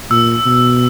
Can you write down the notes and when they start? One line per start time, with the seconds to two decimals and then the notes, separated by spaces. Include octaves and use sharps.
0.10 A#2 E6
0.46 B2